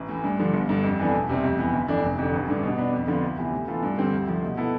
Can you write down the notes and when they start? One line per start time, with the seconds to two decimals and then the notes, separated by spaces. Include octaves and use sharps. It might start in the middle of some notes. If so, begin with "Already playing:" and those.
Already playing: A1
0.09 A2 E3
0.24 G2
0.39 D3 F3
0.53 G1
0.69 G2 D3
0.83 F2
0.99 E3 B3 D4 A4
1.14 E1
1.29 D2 C3 G3 C4
1.44 F2
1.58 E3 B3
1.73 G1
1.88 F2 E3 A3 D4
2.03 F1
2.18 F2 D3
2.33 A1
2.48 G2 D3
2.63 B2
2.78 B3 D4
2.93 F2
3.08 D3 F3 B3 F4
3.23 D2
3.38 C3 E3 B3
3.53 A2
3.68 E3 B3 F4 A4
3.83 G2
3.98 D3 G3 C4
4.13 D2
4.28 C3 F3 A3
4.42 B2
4.57 B3 E4 A4